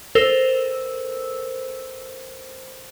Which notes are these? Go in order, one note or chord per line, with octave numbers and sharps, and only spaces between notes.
A4 A#4 C5 E6